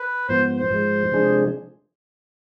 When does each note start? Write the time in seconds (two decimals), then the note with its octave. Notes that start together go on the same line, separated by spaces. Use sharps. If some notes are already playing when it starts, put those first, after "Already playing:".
Already playing: B4
0.28 G#2 F3 B3 C5
0.57 C5
0.70 G#2 F3 G#3
1.12 C3 F3 G#3 D4 G#4